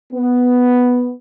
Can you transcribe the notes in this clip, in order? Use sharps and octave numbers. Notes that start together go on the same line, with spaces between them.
B3